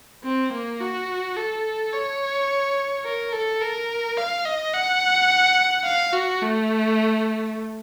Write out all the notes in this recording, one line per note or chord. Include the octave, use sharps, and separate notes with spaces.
C4
A#3
F#4
A4
C#5
A#4
A4
A#4
F5
D#5
F#5
F5
F#4
A3